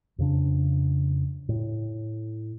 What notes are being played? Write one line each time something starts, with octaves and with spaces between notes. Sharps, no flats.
F2 C#3 D4
A2